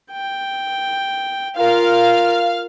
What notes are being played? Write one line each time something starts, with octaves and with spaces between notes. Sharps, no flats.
G5
F4 A#4 F5 F6